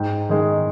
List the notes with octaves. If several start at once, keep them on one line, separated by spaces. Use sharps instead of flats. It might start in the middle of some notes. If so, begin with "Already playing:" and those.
Already playing: G#2 G5
D#3 G#3